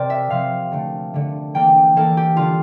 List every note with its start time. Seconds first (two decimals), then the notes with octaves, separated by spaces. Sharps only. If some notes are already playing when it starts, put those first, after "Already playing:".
Already playing: C3 C4 A#4 C5 D5
0.10 E5
0.30 C3 F3 C4 F5
0.72 D3 A3 D4
1.14 D3 A3 D4
1.54 E3 A#3 D4 G5
1.96 E3 A#3 D4 A4
2.17 G4
2.37 D3 G3 D4 F4